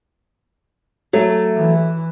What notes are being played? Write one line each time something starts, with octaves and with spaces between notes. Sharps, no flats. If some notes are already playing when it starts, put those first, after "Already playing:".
F#3 A3
E3